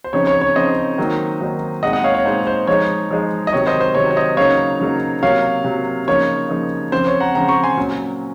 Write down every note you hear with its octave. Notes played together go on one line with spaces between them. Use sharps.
C5
C#3 F3 C4 D#4 C#5
C#5
C#5
C#3 F3 C4 D#4 C5 D#5
D#3 F#3 A#3 D#4
D#3 F#3 A#3 D#4
A#2 G#3 C4 D#4 D#5 F#5
D#5 F#5
C#5 F5
C#5
A#2 G#3 C4 D#4 C5
C5
F3 G#3 D#4 C#5
F3 G#3 D#4
D#5
C3 D#3 F#3 C#5
C5 D#5
C5
C3 D#3 F#3 C#5
C#5
C5 D#5
C#3 F#3 A#3 D#4 C#5 F5
C#3 F#3 A#3 D#4
C3 F#3 A#3 C#5 F5
C3 F#3 A#3
C#3 F3 A#3 D#4 C#5
C#3 F3 A#3 D#4
C#3 F3 C4 C5
C#5
F#5 A#5
C#3 F3 C4 F#5 A#5
A#5 C#6
G#5 C6
A#2 F#3 C#4